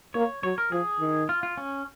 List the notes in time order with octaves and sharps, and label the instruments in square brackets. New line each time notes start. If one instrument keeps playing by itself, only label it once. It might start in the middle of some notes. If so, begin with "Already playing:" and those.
[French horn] A#3 [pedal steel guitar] C#5
[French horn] F#3 [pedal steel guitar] C#5
[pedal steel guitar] A#4
[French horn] F3 [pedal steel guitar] G#4
[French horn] D#3
[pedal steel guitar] F4
F4
C#4